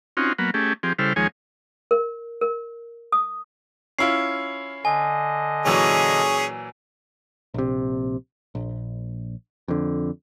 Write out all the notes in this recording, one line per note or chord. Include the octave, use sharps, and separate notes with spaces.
C4 C#4 D#4 F4 F#4
F#3 A#3 B3
A3 C#4 G4 G#4
F3 C4 G4 G#4
C#3 G3 E4 A4 C5 F6
D#2 F3 G#3 G#4 C#5 G#5
A#4
A#4
D#6
C#4 E4 F4 C7
D3 D#5 G#5
A#2 E3 F#3 C#4 G#4
A#1 C3
A#1
F2 D3